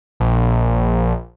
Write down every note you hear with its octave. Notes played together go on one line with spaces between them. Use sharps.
A#1